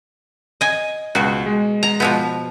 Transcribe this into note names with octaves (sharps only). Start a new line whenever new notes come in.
D#5 G#5
C#2 B2 F#4
G#3
A#5
B2 F3 B3